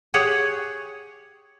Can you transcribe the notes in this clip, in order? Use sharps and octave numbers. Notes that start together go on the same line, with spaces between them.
G4 G#4 C#5 F#5